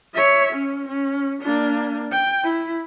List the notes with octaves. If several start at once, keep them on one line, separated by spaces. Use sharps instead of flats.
C#5 E5
C#4
C#4
A#3 D4
G5
E4